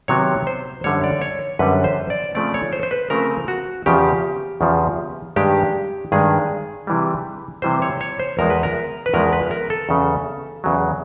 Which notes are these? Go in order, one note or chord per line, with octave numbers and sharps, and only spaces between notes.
C3 D#3 F#3 B3 C#5
C5
F#2 D3 G3 C#5
D5
C#5
F#2 D3 G3 B4
C5
D5
C#3 F3 A3 C4 D5
C#5
C5
C5
B4
C#3 F3 A3 C4 A#4
F#4
E2 C#3 F3 G4
E2 C#3 F3
G2 D#3 G#3 G4
G2 D#3 G#3 G#4
C3 E3 G3
C3 E3 G3 C5
C#5
C#5
C5
E2 C#3 F3 G#3 A#4
B4
A#4
B4
E2 C#3 F3 G#3 A#4
B4
A#4
A4
E2 C#3 F#3
E2 C#3 F#3